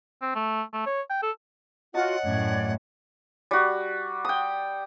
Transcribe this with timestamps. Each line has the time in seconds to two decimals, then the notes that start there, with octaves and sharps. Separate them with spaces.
0.22 C4
0.35 A3
0.73 A3
0.86 C#5
1.10 G5
1.23 A4
1.94 F4 F#4 C#5 D#5 F#5 A5
2.25 F#2 A2 D5 G#6
3.51 G3 F#4
4.25 G5 D#6